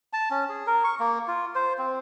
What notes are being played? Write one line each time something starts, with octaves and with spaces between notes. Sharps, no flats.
A5
C#4
G#4
A#4
C#6
A#3
F4
C5
C4